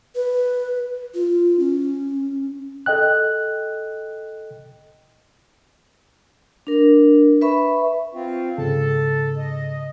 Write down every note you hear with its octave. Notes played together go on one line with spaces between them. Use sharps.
B4
F4
C#4
A4 D#5 G5 F#6
D4 A#4
B4 E5 B5 C#6
C4 F4
G#2 C#3 A4 A5
D#5